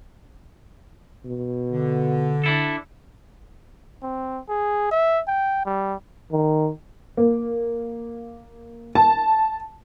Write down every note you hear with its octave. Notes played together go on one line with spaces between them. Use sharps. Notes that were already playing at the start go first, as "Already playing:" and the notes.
B2
D3
D4 E4 A4
C4
G#4
E5
G5
G3
D#3
A#3
A5